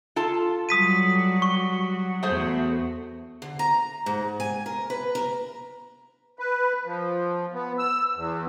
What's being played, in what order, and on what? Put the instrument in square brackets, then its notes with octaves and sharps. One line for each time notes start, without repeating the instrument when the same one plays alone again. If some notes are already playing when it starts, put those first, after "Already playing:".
[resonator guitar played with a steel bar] F4 A4 A5
[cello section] F#3 G3 F#4 [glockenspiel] D#6 B6 D#7
[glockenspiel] C#6
[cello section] E2 F#4 [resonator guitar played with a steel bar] A3 G#4 C5
[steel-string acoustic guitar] D3
A#5
G#2
G#5
A#4
B4
A#4
[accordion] B4
F3
B3
E6
E2